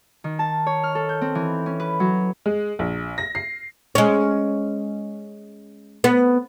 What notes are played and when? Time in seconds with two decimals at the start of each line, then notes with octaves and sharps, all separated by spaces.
0.24 D#3
0.39 A5
0.66 C#5
0.83 F6
0.95 A4
1.09 G6
1.21 C4
1.35 E3
1.66 C#4
1.80 B4
2.00 F#3
2.46 G#3
2.79 A#1
3.18 A#6
3.35 C7
3.95 G#3 C#4
6.04 B3